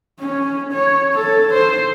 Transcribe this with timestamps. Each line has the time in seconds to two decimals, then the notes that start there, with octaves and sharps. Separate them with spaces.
0.19 C#4
0.73 C#5
1.15 A4
1.54 C5